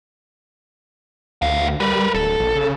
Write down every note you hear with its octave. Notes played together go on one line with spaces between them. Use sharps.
D2 B3 F5
G3 A#4 B4
D1 A4
A#1
C#3